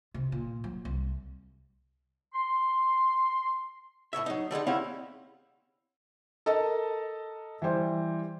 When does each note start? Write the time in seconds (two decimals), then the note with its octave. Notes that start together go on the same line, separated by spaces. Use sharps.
0.14 C3
0.32 A#2
0.64 F#3
0.85 C2
2.33 C6
4.13 A2 B3 C#5 E5
4.26 F#3 D#4
4.51 D3 G3 G#3 D#4
4.67 C4 C#4 E4 G4 F5 F#5
6.46 A4 A#4 D#5 A5
7.62 E3 G3 C5